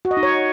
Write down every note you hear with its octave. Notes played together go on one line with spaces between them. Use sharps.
F#4
D#5
D#4
C#5